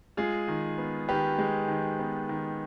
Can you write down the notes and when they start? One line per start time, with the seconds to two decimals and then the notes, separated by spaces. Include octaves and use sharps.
0.17 G#3 F4 G#4
0.48 D#3
0.78 B3
1.09 D#3 G4 B4
1.39 G#3
1.68 D#3
1.99 B3
2.29 D#3